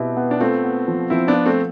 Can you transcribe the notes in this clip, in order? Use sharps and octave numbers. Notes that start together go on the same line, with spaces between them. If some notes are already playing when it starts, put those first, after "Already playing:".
Already playing: B2 B3 C4 E4 G4
B3
D4
A3 C4 F4
B3
F3
F3 C4 E4
B3 D4
F4
A3 C4